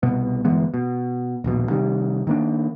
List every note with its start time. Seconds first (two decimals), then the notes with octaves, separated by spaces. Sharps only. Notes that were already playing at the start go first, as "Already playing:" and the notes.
0.03 C2 B2 B3
0.45 G1 E3 G#3 B3
0.74 B2
1.44 D#1 A#1 B2
1.70 C3 D#3 G3
2.27 D#3 A#3 D4